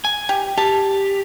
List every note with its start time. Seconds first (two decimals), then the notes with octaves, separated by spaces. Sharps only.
0.05 G#5
0.29 G4
0.58 G4 A5